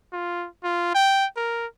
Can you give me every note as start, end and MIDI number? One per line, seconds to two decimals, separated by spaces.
0.12 0.47 65
0.63 0.94 65
0.95 1.26 79
1.36 1.66 70